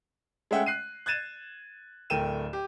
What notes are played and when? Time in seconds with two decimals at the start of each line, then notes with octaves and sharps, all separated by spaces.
0.51 G#3 A3 C#4 E5 F#5 G5
0.66 F#6 C7 D#7
1.06 F#6 G#6 A6 D#7 E7
2.10 D1 A3 A#4 G5 D#7 E7
2.53 G4